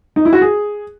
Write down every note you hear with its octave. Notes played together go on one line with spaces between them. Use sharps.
D#4
E4
F#4
G#4